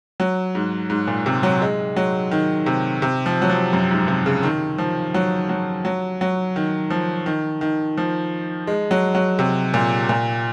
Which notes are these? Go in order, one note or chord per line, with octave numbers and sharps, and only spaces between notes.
F#3
G#2
G#2
A#2
C3
F#3
G#3
F#3
D#3
C3
C3
F3
F#3
F3
F#2
G#2
C3
C#3
D#3
F3
F#3
F#3
F#3
F#3
D#3
F3
D#3
D#3
F3
G#3
F#3
F#3
C3
A#2
A#2